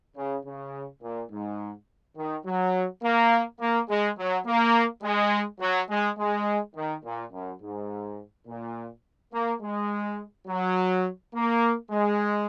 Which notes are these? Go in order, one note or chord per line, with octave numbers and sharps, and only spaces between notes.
C#3
C#3
A#2
G#2
D#3
F#3
A#3
A#3
G#3
F#3
A#3
G#3
F#3
G#3
G#3
D#3
A#2
F#2
G#2
A#2
A#3
G#3
F#3
A#3
G#3